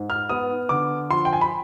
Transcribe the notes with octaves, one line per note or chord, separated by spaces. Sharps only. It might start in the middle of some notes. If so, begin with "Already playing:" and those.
Already playing: G#2
F6
B3 D#6
D3 D6
F3 C6
G5
G#5
B5